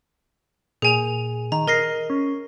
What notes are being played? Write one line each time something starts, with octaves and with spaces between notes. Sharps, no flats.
A#2 G#4 G#5 F7
D#3 A#5
A#4 D#5 A#6 C7
C#4